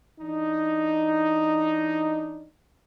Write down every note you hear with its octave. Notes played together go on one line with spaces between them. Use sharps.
E3 D4 D#4